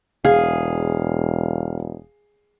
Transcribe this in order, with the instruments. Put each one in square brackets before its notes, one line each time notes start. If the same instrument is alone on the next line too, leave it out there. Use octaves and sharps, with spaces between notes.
[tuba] E1 [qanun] G#4 [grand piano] F5